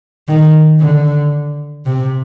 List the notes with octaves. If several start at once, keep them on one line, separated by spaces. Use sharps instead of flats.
D#3
D3
C3